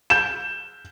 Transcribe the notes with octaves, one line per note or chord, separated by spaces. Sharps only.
G6 E7